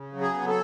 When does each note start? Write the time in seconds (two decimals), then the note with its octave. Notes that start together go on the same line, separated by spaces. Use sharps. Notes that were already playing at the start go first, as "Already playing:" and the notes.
Already playing: C#3
0.13 F#3
0.21 G#4
0.34 B3
0.47 A4